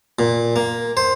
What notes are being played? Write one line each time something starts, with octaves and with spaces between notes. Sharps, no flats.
A#2
A#3
C5